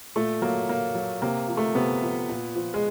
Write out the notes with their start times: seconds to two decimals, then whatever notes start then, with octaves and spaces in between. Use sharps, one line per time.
0.16 A#2 A3
0.42 F#3 A#3
0.69 A#2 A#3
0.95 F#3
1.22 C3 A#3
1.48 F3
1.57 A3
1.75 C3 B3
2.02 F3
2.29 A#2
2.56 F3
2.74 G#3